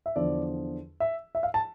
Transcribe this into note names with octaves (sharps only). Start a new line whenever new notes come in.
E5
E2 D3 F3 D5
E5
E5
F5
A5